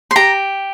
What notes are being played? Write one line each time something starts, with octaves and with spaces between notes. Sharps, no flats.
C6
G4 A#5